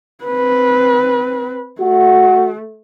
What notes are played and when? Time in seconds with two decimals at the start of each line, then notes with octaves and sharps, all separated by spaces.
0.25 C4 B4
1.81 A3 F#4